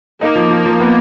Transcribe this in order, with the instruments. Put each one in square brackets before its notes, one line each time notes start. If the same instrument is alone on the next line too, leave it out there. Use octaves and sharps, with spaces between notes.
[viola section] A#3 [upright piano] D#4
[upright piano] F3
F3
F3
B3